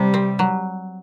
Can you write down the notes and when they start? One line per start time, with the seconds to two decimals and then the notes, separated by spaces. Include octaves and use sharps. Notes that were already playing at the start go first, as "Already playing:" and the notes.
Already playing: C3 G3
0.14 C4
0.39 F#3